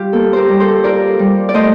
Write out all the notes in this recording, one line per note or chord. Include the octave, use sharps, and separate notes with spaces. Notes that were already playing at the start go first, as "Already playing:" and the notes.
Already playing: G3 F4 G4
A#3 A4
G4 A#4 C5
G3
A4 C5
F4 A#4 D5
G3
D5
A3 C5 D#5